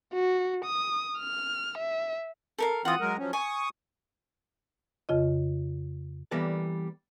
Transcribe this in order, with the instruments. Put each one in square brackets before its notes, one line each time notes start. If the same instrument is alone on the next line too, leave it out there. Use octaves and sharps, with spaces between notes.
[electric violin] F#4
D#6
F6
E5
[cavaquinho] A4 A#4 F5
[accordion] E3 C4 F4 [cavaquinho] F#5 D#6
[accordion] F#3 G#3 A#4
F3 F#3 C#4
[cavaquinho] G#5 [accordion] C#6 D#6
[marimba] F2 C#3 F4 D#5
[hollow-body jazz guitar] E3 G3 A#3 B3 A4 D5